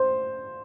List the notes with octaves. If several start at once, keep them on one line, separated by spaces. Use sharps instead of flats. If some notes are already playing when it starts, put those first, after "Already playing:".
Already playing: C5